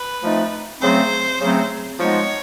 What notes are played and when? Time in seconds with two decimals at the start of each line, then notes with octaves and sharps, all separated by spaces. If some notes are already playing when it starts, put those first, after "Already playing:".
Already playing: B4
0.23 F3 A3 C4 D#4
0.81 C#3 F#3 A3 C4 C5
1.41 C#3 F#3 A3 C4
1.99 F3 G#3 B3 D#4 C#5